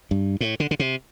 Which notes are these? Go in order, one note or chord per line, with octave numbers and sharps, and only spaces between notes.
G2
A2
D3
D3
C3